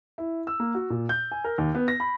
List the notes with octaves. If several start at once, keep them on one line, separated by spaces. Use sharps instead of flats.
E4
E6
A#3
F#4
A#2
G6
G#5
A#4
D#2
B3
A#6
B5